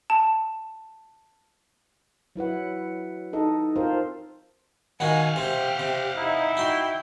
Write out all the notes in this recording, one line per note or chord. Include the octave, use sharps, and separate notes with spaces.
A5
F#3 E4 B4 F#5
D#4 A4 D#5
C4 F4 A#4 C5
D#3 D#4 F#4 F5 F#5 G#5
C3 C4 G4
C3
D#4 E4
D#4 F#4 G5 C6